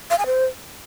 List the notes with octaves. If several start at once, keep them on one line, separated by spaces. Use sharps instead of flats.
F5
G#5
C5